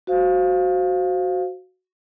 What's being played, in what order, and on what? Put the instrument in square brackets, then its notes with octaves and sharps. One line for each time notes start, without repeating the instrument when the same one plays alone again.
[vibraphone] F#4 C5 F5